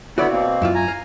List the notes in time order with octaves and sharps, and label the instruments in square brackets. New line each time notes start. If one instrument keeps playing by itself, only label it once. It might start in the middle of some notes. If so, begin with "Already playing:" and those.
[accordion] D3 B3 E4 [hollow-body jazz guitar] F#4 C#5 D5
[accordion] B2 A#3 C4
[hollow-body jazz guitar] F#2 E4 F4
[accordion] G#5 A#5
[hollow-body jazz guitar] F5